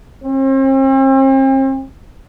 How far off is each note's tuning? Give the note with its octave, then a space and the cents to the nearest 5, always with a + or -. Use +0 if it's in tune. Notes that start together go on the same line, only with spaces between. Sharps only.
C4 +40